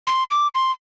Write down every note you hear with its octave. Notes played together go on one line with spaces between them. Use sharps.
C6
D6
C6